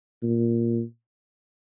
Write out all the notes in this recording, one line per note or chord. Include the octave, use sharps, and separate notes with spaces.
A#2